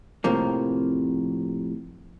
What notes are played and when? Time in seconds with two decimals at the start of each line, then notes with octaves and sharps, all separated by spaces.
0.24 F2 A2 C3 F3 A#3